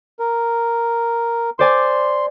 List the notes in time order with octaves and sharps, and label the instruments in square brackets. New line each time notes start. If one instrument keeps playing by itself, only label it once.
[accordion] A#4
[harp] C5 D5 G#5 [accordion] C6